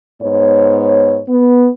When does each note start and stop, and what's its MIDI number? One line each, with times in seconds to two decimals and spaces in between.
0.22 1.20 44
0.22 1.20 59
0.22 1.20 73
1.28 1.68 59